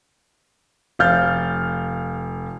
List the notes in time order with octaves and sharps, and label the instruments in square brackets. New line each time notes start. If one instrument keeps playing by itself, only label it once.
[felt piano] F1 F5 F6 G6 A6